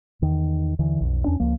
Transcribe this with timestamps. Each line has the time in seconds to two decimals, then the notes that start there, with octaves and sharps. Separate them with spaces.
0.22 E2 D#3
0.79 D#2 D3 E3
1.01 B1 F2
1.24 E2 C#4 D4
1.40 C#2 F3 A#3